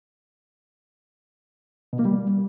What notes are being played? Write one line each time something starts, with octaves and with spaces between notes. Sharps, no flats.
B2
A#3
G3